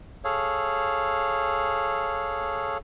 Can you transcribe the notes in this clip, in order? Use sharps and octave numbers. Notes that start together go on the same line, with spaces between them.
G#4 A4 C#5 F5